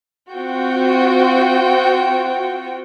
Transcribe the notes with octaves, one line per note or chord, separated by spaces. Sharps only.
C4 F4 F#4 G5